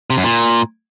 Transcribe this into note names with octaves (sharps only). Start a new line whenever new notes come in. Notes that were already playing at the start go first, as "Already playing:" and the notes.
C3
F#2
A#2